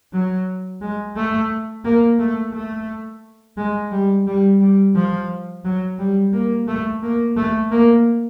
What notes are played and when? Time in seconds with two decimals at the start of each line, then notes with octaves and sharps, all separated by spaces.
0.13 F#3
0.81 G#3
1.16 A3
1.84 A#3
2.19 A3
2.53 A3
3.57 G#3
3.92 G3
4.27 G3
4.60 G3
4.95 F3
5.64 F#3
5.99 G3
6.33 A#3
6.67 A3
7.02 A#3
7.37 A3
7.72 A#3